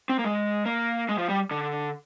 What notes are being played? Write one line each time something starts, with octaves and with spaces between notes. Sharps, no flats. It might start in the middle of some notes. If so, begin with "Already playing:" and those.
C4
A#3
G#3
A#3
G#3
F3
G3
D3